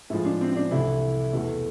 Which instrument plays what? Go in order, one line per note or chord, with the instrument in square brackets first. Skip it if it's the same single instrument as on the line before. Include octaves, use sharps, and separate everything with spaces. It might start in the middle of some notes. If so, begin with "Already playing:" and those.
[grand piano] A2 F3 G#3 E4
D4
C4
C4
D4
C2 C3 E3 A3 E4
E2 B2 A3